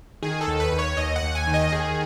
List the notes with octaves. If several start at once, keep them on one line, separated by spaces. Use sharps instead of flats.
D#3 G#4
A4
D#2
B4
D#2
C#5
D#2 D#5
F#5
D#2
G#5
D#3
D#5
D#2 G#4